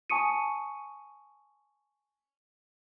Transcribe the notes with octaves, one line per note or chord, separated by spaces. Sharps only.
G#5 A5 C#6 D#6 C#7 D#7